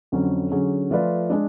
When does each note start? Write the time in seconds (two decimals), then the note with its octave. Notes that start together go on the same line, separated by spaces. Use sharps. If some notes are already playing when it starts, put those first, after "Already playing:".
0.12 F2 D3 F#3 C#4
0.51 D3 F#3 C#4 G#4
0.91 F3 A3 F4 B4 D5
1.29 G#3 D4